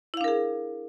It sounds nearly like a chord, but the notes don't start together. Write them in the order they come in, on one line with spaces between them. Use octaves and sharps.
E4 F5 D4 A#4 G#4